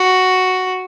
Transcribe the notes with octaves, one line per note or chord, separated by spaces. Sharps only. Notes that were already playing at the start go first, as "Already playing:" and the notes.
Already playing: F#4